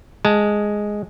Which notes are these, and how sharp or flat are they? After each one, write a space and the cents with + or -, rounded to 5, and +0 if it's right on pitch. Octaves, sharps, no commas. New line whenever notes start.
G#3 +0 A5 +0